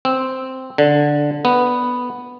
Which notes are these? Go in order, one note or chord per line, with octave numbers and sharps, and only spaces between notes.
C4
D3
B3